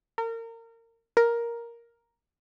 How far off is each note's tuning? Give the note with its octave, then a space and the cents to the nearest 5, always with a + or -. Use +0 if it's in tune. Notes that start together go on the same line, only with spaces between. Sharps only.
A#4 -30
A#4 +5